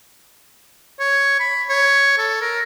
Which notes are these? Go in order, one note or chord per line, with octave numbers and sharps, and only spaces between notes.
C#5
B5
C#5
A4
A#4